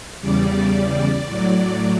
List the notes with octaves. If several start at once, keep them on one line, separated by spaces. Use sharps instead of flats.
E2 C#3 G3 D5
A2 F#3